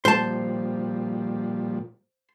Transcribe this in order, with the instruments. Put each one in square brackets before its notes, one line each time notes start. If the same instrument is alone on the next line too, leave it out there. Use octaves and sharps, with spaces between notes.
[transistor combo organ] A#2 F3 G3 [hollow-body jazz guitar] C5 A5